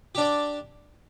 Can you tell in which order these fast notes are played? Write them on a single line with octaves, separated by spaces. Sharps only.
G4 D4 D5